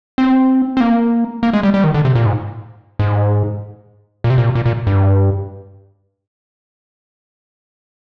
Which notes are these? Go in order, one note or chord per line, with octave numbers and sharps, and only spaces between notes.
C4
C4
A#3
A#3
G#3
G3
G3
D#3
D3
C3
A#2
G#2
G#2
A#2
C3
A#2
A#2
A#2
G2